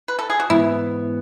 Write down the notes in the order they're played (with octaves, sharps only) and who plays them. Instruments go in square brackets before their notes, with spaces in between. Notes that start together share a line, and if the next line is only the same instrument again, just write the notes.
[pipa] B4
A4
G#4
F#4
[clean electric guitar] G#2 E3 B3 [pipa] E4